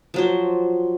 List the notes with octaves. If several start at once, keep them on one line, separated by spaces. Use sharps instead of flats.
F3 F#3 C5